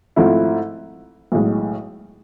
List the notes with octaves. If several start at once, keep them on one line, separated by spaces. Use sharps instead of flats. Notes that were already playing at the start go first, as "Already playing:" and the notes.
G#2 F3 A3 C4 E4
B1 A2 G#3